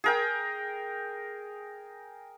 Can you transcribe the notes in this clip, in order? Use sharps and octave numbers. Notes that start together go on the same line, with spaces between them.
G#4 A#4 G5